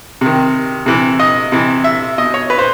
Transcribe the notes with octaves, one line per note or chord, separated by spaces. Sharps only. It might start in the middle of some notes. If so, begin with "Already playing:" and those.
C3 D#3
C3 E3
D#5
C3 E3
E5
B2 D#5
C#5
B4
C5